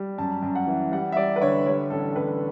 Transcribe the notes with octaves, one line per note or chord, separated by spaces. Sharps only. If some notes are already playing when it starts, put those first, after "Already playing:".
Already playing: G3
F#2 A5
F#2
F#5
E3
G3 F#5
E5
G3 D5
B4
D3 C#5
G3 C#5
A1 A4
A1 B4